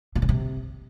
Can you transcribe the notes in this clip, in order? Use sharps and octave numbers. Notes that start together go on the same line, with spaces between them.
B2
C#3
C3